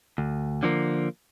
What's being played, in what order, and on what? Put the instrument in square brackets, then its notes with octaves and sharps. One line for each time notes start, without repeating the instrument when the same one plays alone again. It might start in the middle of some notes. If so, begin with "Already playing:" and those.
[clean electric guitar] D2
D3 F3 A#3